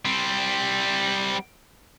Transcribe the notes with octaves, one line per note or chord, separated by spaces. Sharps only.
G3 C4